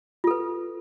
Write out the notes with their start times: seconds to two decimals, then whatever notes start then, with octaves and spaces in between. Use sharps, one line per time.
0.24 F4
0.27 A4
0.31 B4